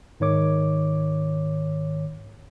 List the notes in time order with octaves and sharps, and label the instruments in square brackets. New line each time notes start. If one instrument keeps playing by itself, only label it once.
[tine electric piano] G#2 D#3 C#5 D6